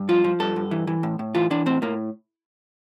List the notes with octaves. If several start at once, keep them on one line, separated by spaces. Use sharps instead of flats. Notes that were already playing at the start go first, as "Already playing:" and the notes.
Already playing: G2
F3 F4
F3
G2 A4
G2
E3
E3
A2
A2
E3 F4
E3 D4
A2 C4
A2 A#3